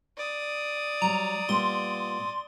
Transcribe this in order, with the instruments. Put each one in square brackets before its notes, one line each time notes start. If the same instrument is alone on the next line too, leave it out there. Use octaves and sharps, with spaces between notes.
[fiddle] D5 D#6
[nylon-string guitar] F#3 G3 [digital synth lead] A#5
[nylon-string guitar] A#2 G3 B3 [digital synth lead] C6